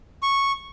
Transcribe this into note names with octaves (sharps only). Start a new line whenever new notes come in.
C#6